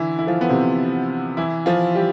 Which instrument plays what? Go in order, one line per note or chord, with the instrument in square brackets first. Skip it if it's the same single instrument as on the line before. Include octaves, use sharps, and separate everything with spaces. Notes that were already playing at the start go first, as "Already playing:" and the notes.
Already playing: [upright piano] D3 E3 E4
E4
F3 F4
B3
C3 C4
E3 E4
F3 F4
G3 G4